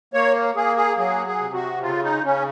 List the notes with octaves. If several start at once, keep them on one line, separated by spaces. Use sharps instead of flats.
A#3 C#5
A#3 G#4
G#4
F#3 G#4
G#4
C3
F#4
C#3 F4
D#4
C#3 C#4